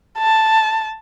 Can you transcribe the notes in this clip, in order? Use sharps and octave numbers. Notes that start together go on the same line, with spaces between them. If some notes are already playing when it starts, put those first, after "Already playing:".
A5